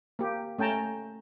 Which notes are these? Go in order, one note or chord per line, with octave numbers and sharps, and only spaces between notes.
A#3 G4
A3 C#4 G5 A5 A#5